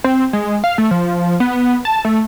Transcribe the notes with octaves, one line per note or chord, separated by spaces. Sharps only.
C4
G#3
F5
A3
F3
B3
A5
A3